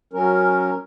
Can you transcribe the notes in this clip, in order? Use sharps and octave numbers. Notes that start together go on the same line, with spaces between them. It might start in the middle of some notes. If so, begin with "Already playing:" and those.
F#3 C#4 A#4